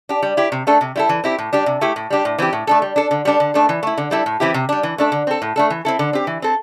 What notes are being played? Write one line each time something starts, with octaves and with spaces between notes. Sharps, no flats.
D4 G4
G3
E4 G4
C3
A3 D4 A4
C3
G3 E4 A4
E3
C4 E4 G4
A2
G3 D4 G4
C3
A3 E4 G4
A2
G3 D4 G4
A2
E3 C4 G4
A2
A3 D4 A4
G3
D4 A4
D3
G3 D4 A4
D3
A3 D4 A4
E3
A3 E4
D3
G3 E4 A4
A2
E3 C4 E4 G4
C3
G3 D4
E3
A3 D4 A4
D3
C4 A4
A2
A3 D4 A4
E3
C4 E4 A4
D3
C4 G4
E3
C4 A4